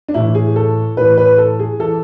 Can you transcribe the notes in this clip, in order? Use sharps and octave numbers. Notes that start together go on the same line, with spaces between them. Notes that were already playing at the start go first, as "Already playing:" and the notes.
D4
A2 E3 E4
G#4
A4
A2 E3 B4
B4
A4
G#4
E3 A4